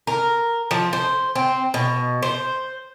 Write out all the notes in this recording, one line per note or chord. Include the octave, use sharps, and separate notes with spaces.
A#4
F3
C5
C4
B2
C5